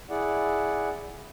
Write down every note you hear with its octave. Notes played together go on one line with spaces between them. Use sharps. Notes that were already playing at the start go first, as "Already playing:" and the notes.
E4 G#4 D5 F#5